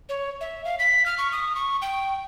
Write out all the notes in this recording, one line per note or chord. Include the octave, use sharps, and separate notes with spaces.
C#5
E5
F5
B6
F6
C#6
D#6
C#6
G5